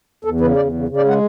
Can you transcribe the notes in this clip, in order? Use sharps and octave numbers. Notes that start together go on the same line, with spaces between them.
E2 A4
C#3 B4
E2 D5
C#3
C#3
D5
G#3 F#5